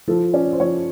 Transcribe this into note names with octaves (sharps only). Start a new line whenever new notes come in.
F3 A4
C#4 D5
C5
F3 C#5